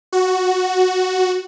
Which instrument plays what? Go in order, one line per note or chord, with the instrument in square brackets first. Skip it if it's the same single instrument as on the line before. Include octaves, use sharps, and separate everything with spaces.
[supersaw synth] F#4